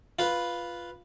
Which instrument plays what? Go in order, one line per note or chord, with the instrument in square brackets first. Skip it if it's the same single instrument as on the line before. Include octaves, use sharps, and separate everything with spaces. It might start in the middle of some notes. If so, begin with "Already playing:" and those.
[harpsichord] F4 B4